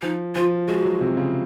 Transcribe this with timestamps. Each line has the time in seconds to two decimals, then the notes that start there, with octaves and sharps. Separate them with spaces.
0.02 F3 D#4
0.35 F3 F4
0.68 G#3 F#4
0.85 F#3
1.01 C3
1.17 C#3